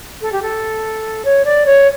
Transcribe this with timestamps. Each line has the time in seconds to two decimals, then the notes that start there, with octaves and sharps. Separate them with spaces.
0.21 A4
0.32 G4
0.42 A4
1.24 C#5
1.45 D5
1.65 C#5